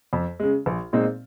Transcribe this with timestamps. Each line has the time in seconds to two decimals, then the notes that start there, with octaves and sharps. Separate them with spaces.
0.13 F2
0.40 C#3 G#3
0.66 A#1
0.93 A#2 G#3 C4 D#4